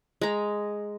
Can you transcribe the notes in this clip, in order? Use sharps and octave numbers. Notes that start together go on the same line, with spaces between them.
G#3 A#5